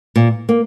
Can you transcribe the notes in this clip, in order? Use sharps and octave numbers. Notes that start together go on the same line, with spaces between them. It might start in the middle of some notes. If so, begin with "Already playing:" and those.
A#2
A#3